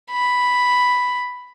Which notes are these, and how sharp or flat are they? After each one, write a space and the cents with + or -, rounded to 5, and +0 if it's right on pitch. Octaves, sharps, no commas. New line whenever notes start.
B5 +0